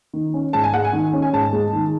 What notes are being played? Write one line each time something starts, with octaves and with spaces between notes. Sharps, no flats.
D#3
C#4
G#2 A5
G#5
G#3 F#5
G#5
D#3
C#4
G#5
G#2 A5
G#3
D#3